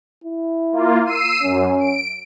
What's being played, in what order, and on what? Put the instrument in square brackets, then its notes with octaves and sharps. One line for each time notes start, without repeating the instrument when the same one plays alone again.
[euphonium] E4
[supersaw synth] A#3 F4
E6 C7 D#7
[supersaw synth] F#2 [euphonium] C#4
[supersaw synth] D7